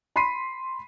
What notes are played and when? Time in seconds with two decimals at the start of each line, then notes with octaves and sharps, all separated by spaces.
0.16 B5 C6 B6 C7 D#7